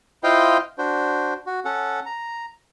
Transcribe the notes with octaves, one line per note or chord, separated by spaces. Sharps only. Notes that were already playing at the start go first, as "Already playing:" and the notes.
E4 F4 C5 D#5 F5 G5
D4 F#4 C5
F#4
C#4 A4 F#5
A#5